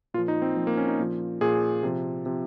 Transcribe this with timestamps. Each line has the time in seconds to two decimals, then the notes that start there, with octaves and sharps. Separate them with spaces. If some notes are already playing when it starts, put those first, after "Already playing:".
0.14 A#2 F4
0.18 F3
0.28 D#4
0.42 C4
0.57 A#2 F3
0.67 A#3
0.77 C#4
0.88 D#4
0.99 A#2 F3
1.41 A#2 F3 G#4
1.83 C3 F3
2.26 C3 F3